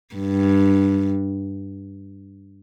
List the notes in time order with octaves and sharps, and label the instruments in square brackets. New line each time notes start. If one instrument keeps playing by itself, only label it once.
[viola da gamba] G2